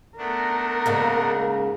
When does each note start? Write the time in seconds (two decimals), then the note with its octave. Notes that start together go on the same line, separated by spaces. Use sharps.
0.18 A3 B3 D4 A#4
0.86 G#2 C#3 A#3